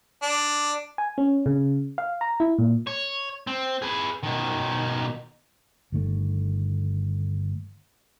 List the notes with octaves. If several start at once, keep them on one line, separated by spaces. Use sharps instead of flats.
D4
G#5
C#4
C#3
F5
A#5
E4
A#2
C#5
C4
G#4 B4
B2 D#3
G1 D#3 A3